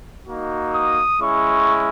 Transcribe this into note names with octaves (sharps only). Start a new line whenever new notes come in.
A#3 D#4 F#4
D#6
G#3 C#4 E4 C#6